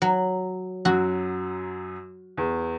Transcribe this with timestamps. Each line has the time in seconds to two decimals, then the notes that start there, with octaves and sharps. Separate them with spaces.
0.02 F#3
0.85 F#2 F#3 F#4
2.37 E2